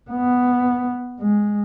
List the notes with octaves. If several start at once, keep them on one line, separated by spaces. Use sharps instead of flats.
B3
G#3